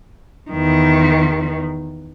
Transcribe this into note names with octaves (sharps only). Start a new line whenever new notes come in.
E2 D#3